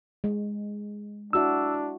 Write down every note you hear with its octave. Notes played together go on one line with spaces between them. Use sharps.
G#3
D4 E4 F#4 E5 E6